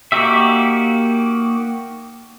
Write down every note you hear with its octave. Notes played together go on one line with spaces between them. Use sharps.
A#3 D#4 F#4 G4 E5